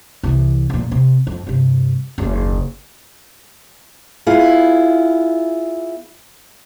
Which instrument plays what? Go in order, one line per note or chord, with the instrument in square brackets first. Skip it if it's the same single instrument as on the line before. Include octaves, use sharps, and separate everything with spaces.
[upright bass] C2 E3
F2 A#2
C3
F2
G2 C3
F#1 D#2
[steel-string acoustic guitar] B3 E4 F4 G#4